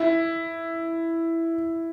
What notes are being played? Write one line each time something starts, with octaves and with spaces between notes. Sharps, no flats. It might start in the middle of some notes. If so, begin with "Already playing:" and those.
Already playing: E4